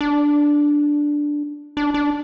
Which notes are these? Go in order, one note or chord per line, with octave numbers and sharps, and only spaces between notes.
D4
D4
D4